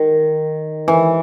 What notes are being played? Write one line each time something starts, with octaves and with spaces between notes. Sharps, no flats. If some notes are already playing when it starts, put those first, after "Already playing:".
Already playing: D#3
E3